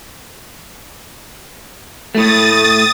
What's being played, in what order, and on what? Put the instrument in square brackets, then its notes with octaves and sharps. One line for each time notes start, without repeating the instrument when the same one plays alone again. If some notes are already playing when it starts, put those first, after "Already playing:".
[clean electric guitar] A2 A3 [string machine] D#6 A6